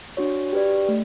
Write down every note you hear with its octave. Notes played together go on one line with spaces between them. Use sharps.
D4 F#4 C#5
G4 B4 D5
A3